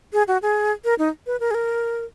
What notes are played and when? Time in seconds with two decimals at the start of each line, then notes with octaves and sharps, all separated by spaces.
0.13 G#4
0.28 F#4
0.42 G#4
0.85 A#4
0.99 D#4
1.27 B4
1.40 A#4
1.51 G#4
1.54 A#4